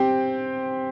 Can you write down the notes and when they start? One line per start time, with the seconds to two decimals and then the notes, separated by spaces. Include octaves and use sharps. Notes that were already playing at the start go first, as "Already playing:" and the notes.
Already playing: C4 G4